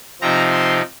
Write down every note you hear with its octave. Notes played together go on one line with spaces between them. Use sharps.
C3 F3 C4 D#4 A#5
C6